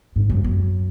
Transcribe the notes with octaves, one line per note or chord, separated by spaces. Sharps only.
G#2
F#2
F#2